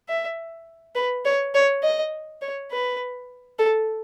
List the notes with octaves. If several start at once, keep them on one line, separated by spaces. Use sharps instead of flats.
E5
B4
C#5
C#5
D#5
C#5
B4
A4